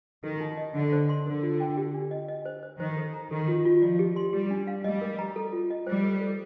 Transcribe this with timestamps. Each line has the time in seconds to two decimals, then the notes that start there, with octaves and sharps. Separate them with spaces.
0.23 D#3 A4
0.41 D#4
0.57 D#5
0.75 D3 D#5
0.93 C5
1.09 C6
1.26 D3 A#4
1.43 F4
1.60 G5
1.77 G4
1.94 D4
2.11 D#5
2.28 D#5
2.45 C5
2.63 C5
2.80 D#3 C5
2.97 A4
3.14 A#5
3.31 D#3 A4
3.48 F4
3.65 F4
3.82 F3 D5
3.99 G4
4.16 C6
4.33 G3 G4
4.51 D4
4.67 F5
4.84 G3 D#5
5.01 A#4
5.19 A#5
5.36 A4
5.53 F4
5.70 D#5
5.87 G3 C5
6.04 A4
6.21 A4